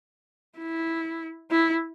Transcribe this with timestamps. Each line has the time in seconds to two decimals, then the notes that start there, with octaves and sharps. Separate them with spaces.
0.58 E4
1.51 E4